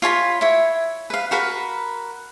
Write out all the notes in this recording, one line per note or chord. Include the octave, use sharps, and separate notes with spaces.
F4 C#5 A5 B5
E4 C#5
B4 F5
F#4 A#4 B4 B5